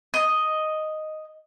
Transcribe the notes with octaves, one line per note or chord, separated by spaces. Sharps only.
D#5